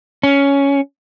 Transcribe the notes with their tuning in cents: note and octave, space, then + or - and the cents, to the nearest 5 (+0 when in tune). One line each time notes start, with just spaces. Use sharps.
C#4 +10